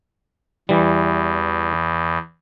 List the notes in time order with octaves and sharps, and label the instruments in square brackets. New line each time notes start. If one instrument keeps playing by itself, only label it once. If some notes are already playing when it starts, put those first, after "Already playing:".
[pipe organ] E2 [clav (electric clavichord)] E3 G3